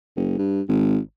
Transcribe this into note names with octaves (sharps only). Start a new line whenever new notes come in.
F#1
G2
G#1